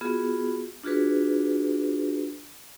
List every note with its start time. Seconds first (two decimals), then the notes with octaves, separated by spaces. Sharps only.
0.01 B3 F4 F#4 G#4
0.83 D4 F4 F#4 G#4 B4